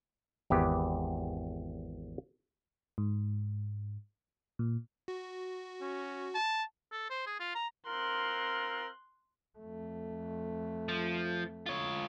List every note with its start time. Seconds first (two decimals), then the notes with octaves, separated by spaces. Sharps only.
0.50 G#1 E2 G4 B4
2.98 G#2
4.59 A#2
5.08 F#4
5.81 C#4
6.34 A5
6.92 A4
7.10 C5
7.27 G#4
7.40 F4
7.55 A#5
7.87 C4 F4 A#4 C6 F#6
9.59 F2 A3
10.89 F3
11.66 F4 C#5